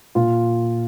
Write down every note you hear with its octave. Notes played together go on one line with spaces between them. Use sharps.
A#2 F4